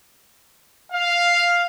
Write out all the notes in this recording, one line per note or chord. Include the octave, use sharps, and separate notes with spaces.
F5